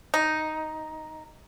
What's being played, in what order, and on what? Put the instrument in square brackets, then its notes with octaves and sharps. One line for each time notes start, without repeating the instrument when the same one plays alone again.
[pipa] D#4